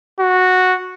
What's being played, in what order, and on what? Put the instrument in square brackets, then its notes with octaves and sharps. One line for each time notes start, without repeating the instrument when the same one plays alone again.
[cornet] F#4